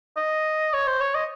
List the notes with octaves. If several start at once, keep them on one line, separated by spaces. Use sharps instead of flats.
D#5
C#5
C5
C#5
D#5